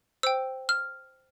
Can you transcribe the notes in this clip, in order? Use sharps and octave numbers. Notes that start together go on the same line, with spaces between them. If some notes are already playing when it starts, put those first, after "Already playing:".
C5 G5 E6
F6